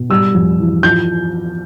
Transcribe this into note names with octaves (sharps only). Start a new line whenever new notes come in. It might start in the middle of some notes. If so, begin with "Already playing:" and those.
Already playing: B2
G3 E6
F2
E3
F3 G6